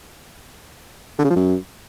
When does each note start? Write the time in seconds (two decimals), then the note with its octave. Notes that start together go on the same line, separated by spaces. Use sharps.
1.19 D3
1.24 C#3
1.30 F3
1.36 F#2